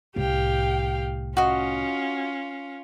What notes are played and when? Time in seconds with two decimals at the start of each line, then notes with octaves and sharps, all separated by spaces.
0.16 C2 A2 G4 F5 G5
1.37 C#4 F4 F#4 D#5